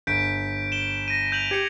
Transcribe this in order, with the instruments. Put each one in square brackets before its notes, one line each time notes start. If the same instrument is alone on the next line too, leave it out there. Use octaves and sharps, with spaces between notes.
[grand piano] G1 [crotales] G6 B6 D7
[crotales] E7 G7
A#6 D#7
G6 F7 F#7
[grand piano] G4 [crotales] G#6 C#7